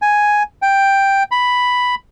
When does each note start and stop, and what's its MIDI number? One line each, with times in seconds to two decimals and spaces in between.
0.02 0.43 80
0.62 1.23 79
1.31 1.95 83